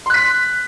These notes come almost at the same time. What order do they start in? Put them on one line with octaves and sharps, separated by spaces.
C6 F#6 B6